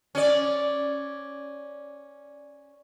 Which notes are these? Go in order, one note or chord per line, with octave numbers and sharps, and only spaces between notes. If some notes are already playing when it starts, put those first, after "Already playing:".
C#4 D5